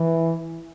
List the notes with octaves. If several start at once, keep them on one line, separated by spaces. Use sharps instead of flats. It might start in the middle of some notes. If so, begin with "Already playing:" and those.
Already playing: E3